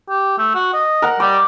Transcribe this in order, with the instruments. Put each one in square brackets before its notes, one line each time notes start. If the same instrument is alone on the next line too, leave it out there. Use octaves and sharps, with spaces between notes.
[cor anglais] G4
A3
F#4
D#5
[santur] A#4 F#5
[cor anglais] G3 [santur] D6